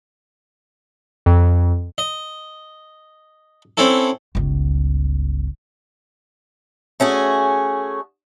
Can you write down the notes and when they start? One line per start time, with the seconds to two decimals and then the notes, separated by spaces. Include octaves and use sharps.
1.26 F2
1.98 D#5
3.77 C4 C#4 E4 A4
4.35 G1 C#2
7.00 A3 C#4 F#4 G#4